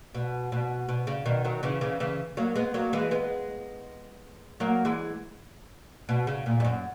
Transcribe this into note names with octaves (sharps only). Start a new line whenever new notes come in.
B2
B2
B2
C#3
B2 D#3
D#3 F#3
C#3 E3
C#3 E3
C#3 E3
F#3 A#3
G#3 B3
F#3 A#3
E3 G#3
G#3 B3
F#3 A#3
E3 G#3
B2
C#3
A#2
G#2
F#2